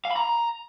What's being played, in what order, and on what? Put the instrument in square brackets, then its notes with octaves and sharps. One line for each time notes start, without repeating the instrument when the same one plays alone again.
[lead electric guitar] F5
B5
A#5